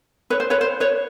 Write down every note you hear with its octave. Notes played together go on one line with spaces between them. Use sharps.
B4 C#5
C5
B4 C#5
C5
B4 C#5